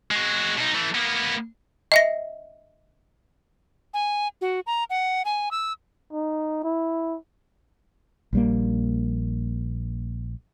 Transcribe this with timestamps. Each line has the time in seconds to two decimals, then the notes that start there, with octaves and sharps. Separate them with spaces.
0.11 G#3 F#4
0.58 B2 D#4
0.74 E3 A3
0.95 A#3 B3
1.92 D#5 E5 A#6
3.94 G#5
4.41 F#4
4.67 A#5
4.90 F#5
5.25 G#5
5.51 E6
6.13 D#4
6.64 E4
8.33 A#1 G3 A#3